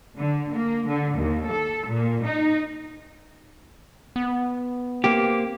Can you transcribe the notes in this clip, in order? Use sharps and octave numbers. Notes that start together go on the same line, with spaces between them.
D3
A#3
D3
D#2
A4
A#2
D#4
B3
A#3 C4 G4